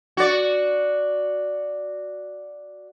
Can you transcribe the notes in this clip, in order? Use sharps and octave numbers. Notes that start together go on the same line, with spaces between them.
F#4 D5